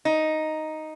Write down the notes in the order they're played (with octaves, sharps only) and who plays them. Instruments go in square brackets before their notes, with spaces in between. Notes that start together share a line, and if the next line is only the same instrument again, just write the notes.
[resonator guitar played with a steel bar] D#4